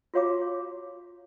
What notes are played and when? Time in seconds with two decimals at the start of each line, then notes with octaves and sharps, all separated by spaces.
0.14 F4 F#4 C#5 F5 A#5 D6